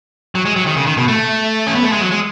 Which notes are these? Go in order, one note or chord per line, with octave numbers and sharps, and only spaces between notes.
F#3
G#3
F#3
D#3
C#3
D#3
B2
A3
C#4
B3
A3
G#3
F#3
G#3